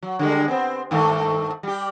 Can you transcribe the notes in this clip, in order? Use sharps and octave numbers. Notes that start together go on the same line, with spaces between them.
F#3
D3 G3 G#3
B3 C4
G2 D#3 A3
G3 G4